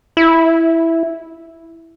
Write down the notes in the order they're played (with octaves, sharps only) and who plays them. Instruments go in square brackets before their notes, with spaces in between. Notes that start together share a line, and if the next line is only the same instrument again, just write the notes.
[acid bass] E4